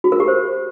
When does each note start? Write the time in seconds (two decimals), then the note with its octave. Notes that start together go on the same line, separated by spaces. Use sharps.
0.04 F#4
0.12 A#4
0.20 G4
0.28 C5